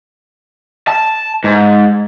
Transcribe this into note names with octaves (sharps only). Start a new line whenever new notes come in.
A5
G#2